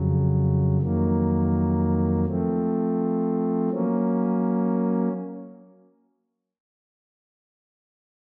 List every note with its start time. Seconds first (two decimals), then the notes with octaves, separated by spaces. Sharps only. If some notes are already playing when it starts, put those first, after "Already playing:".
Already playing: F2 C#3 F#3
0.81 F2 D#3 F#3 A#3
2.26 F3 A3 C4
3.69 F#3 A#3 C#4